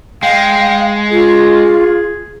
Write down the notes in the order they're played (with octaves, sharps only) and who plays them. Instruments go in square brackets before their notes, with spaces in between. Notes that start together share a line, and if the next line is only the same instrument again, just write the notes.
[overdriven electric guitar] G#3 [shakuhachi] F5 [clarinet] G5
[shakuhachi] F4 [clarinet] G#4